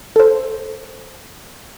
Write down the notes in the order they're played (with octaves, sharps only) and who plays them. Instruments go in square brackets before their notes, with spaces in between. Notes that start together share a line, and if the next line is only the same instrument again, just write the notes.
[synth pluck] A4 C5